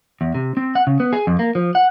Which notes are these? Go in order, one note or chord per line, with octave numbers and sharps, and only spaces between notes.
E2
C3
C4
F#5
C#3
B3
G#4
F2
A#3
F3
F#5